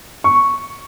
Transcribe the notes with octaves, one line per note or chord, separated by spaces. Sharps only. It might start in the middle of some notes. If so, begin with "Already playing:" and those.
C#6